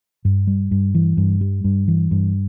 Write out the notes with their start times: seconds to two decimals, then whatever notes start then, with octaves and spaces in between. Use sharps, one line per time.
0.25 G2
0.47 G3
0.71 G2
0.95 E3
1.17 G2
1.41 G3
1.64 G2
1.88 E3
2.11 G2